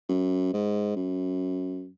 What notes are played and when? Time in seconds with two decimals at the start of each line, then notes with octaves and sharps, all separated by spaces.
0.09 F#2
0.53 G#2
0.96 F#2